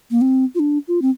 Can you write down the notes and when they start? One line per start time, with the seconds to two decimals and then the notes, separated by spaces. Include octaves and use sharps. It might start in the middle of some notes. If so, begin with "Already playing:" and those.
0.11 A#3
0.21 C4
0.55 F4
0.59 D4
0.88 F4
1.02 C4